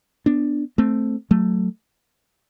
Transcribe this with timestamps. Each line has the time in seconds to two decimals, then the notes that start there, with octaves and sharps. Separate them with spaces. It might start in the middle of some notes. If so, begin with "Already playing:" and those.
0.26 B3 D4
0.78 A3 C4
1.31 F#3 A3